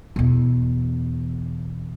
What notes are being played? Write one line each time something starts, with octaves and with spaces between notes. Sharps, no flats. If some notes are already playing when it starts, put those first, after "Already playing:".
E2 B2